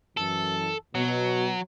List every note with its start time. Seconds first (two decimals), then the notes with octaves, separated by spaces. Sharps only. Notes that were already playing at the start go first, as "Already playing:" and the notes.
0.17 F#2 E3 A4
0.95 B2 F#3